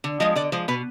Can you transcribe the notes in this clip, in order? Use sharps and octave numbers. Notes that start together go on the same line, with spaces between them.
D3
F3 G#3 D#5
D3 D5
F3 G#3 C5
B2 B4